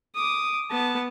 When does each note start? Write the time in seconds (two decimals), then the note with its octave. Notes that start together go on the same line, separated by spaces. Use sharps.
0.15 D6 D#6
0.71 B3 A5